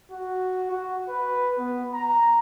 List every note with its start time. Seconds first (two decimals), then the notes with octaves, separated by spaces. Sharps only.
0.12 F#4
0.72 F#4
1.09 B4
1.58 B3
1.94 A#5